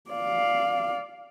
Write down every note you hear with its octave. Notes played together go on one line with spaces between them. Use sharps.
D5 F5